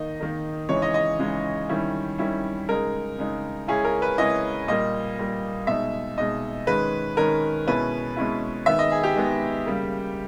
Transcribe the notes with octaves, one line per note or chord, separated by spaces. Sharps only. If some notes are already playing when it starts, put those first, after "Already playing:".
Already playing: D#3 A#3 D#4 D#5
D#3 A#3 D#4
C#3 E3 G#3 D#4 C#5
D#5
D#5
C#3 E3 G#3 D#4
D#3 G3 C#4 E4
D#3 G3 C#4 E4
C#3 G#3 D#4 A#4
C#3 G#3 D#4
C#3 G#3 C#4 E4 G#4
A#4
B4
C#3 G#3 C#4 E4 D#5
A#2 G3 A#3 D#5
A#2 G3 A#3
B2 G#3 D#4 E5
B2 G#3 D#4 D#5
D#3 G#3 C#4 B4
D#3 G#3 C#4 A#4
B2 G#3 C#4 E4 B4
B2 G#3 C#4 E4
D#3 G#3 B3 E5
D#5
G#4
G4
D#3 G#3 B3
C#3 G3 A#3